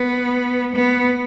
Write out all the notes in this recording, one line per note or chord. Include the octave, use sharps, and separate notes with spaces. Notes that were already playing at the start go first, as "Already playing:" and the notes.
Already playing: B3
B3